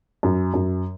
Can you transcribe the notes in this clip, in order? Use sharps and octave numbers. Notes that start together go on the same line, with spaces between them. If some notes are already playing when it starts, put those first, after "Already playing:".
F#2
F#2